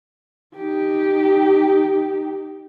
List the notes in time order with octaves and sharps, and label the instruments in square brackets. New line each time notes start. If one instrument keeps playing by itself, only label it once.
[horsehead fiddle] D#4 G4